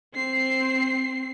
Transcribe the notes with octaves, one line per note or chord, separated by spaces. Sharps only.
C4 C7